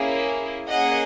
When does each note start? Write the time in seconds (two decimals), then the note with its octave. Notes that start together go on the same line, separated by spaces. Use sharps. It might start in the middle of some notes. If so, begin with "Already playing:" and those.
Already playing: A#3 C#4 E4 G#4
0.69 A#3 C#4 G#4 D#5 F#5